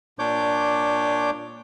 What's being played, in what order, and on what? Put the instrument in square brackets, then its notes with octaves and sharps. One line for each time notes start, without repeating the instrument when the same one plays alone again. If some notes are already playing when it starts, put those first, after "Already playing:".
[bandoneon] A#2 D4 C#5 D6 G6